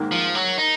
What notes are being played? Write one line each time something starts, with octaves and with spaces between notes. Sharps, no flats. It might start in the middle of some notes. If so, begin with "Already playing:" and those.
Already playing: G#2 D#3 A#3
F3
F#3
D#4